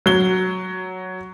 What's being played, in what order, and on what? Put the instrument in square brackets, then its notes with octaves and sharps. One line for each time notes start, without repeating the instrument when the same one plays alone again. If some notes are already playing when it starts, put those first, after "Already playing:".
[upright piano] F#3 G7